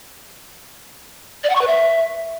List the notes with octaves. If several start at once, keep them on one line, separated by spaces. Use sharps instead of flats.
D5
F#5
C#6
B4
E5